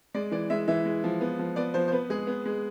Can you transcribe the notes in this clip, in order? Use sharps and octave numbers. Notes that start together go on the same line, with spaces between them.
G#3 D5
E3 D5
G#3 E5
E3 E5
G#3
F3
B3
F3
B3 D5
F3 C5
C5
B3 B4
G#3 G#4
B3
G#3